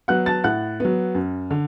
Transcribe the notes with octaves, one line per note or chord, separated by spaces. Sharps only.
F#3 B3 F#5 F#6
A5 A6
A2 F#5 F#6
F#3 B3
F#2
D3